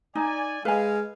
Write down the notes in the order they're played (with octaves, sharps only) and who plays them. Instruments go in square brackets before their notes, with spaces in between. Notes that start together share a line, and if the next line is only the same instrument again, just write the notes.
[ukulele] D#4 [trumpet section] D5 G#5
[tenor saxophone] G#3 [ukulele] B4 G#5 [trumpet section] F5